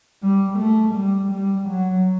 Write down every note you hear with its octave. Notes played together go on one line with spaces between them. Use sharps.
G3
A3
G3
G3
F#3